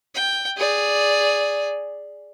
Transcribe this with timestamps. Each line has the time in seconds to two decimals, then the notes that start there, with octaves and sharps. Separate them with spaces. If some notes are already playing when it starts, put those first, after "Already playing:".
0.15 G5
0.57 G#4 D5